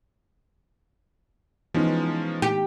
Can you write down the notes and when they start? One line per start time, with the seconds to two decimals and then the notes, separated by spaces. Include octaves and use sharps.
1.74 E3 F3 G#3 B3 C#4 D#4
2.42 G4